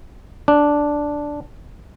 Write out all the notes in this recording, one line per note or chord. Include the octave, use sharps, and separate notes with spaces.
D4